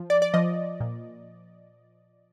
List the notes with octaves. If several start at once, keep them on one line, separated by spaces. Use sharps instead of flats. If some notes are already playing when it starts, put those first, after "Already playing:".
Already playing: F3
D5
D5
F3 D#5
A#2